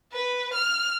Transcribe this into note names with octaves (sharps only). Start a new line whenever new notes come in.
B4
F6